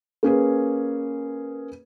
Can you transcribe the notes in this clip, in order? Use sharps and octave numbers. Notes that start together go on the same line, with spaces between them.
A#3 C#4 G#4 B4